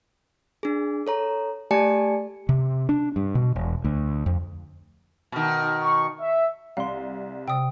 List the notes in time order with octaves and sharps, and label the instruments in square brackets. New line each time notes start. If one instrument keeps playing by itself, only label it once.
[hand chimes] D4 G#4
A4 C#5 A#5
A3 G4 D5 G#5 A5 C#7
[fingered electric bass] C3
D4
G2
B2
E1
D2
F2
[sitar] B2 D#3
[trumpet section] C#6
E5
[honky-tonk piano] C2 [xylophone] F5 C6
[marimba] C3 [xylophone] G5 D#6